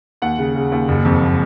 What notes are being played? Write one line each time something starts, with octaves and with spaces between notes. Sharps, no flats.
D#2 F#5
C#3
C#3
D#2
F#1
F2